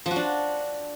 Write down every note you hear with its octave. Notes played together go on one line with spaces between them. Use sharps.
F3
F#4
D4